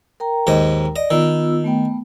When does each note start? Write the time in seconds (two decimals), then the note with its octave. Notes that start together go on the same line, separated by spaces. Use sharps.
0.20 A#4 G5 A#5
0.47 D#2 G#2 D#5
0.96 D5 D#5
1.11 D#3 B3 F4 E6
1.64 A3 B3 G5